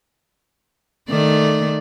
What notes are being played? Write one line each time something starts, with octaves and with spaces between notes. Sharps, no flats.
D#3 A3 D5